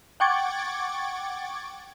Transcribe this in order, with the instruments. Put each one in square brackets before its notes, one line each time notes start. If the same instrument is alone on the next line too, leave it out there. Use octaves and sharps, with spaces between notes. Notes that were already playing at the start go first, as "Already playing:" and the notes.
[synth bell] F#5 G5 C#6 D6 G#6 A6